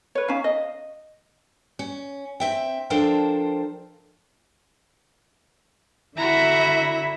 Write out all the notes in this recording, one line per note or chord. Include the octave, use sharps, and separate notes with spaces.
B4 C#5
C#4 D#4 F5
D#5
C#4
C4 E5 G5
F3 D4 A4 A#4 C5 G5
D3 E4 F#4 E5 A#5